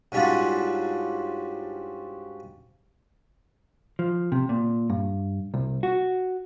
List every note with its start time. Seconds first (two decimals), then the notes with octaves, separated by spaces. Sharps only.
0.12 G#2 G3 C#4 D4 F4 F#4
3.99 F3
4.32 C3
4.49 A#2
4.90 G2
5.54 C2
5.83 F#4